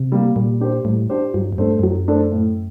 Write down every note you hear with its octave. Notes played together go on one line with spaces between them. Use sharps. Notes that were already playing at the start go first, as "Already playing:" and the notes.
Already playing: C3
G3 A#3
A#2 G3
D4 G4 C5
A2 G3
D4 G4 C5
G2 F#3
F#2
G2 A3 D4 A4 C5
G2
F#2 F#3
A3 D4 A4 C5
A2